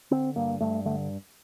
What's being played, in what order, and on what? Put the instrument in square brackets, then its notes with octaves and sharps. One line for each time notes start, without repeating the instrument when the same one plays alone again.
[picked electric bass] D3 C4
G2 A#3
G2 A3
D3 A3